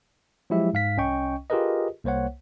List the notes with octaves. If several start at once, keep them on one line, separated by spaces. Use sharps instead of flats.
F3 F#3 G#3 E4 G4 E5
G#2 F5 B6
C2 C#4 D#5 G5 C#6
F4 G4 G#4 A#4 B4 D#5
C2 A#3 C5 C#5 F#5